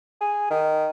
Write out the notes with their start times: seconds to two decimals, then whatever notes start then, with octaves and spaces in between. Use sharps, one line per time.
0.21 G#4
0.50 D#3